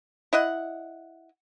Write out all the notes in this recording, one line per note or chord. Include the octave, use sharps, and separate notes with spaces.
E4 D#5 F#5